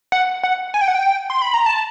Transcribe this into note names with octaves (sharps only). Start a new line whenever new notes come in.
F#5
F#5
G#5
G5
F#5
G5
C6
B5
A#5
A5